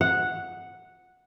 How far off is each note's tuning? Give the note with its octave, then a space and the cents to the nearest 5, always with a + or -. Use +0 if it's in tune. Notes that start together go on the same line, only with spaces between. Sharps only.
F#5 -5